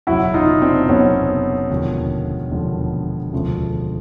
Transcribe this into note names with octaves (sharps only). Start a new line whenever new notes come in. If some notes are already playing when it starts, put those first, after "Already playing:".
F#1 E2 B2 F#3 E4 F#4
D#4 F4
C4 D4
F#1 E2 B2 F#3 B3 C#4
E1 D#2 D3 F3
E1 D#2 D3 F3
E1 D2 C#3 F3